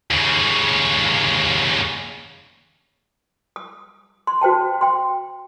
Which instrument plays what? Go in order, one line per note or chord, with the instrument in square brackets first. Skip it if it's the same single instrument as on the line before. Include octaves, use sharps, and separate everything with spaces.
[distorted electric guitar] D#2 C#3
[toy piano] D#6
C6
F#4 C5 G5 A5
G5 C6